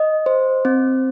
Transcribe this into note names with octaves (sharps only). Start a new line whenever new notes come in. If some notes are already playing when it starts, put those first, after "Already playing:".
Already playing: D#5
C5
C4